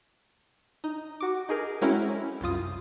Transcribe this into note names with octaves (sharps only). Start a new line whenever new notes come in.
D#4
F#4 D6
D#4 G#4 A#4
G#3 C4 C#4 E4 F#4 A#4
C2 F#2 F4 D#6